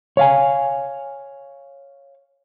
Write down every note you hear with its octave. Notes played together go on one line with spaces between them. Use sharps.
C#5 F5 G#5